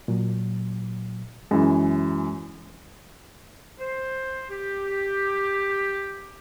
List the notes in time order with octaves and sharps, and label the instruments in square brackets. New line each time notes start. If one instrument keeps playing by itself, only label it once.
[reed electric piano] A#2 F#3
[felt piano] F#2 E3 [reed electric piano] G#3
[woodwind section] C5
G4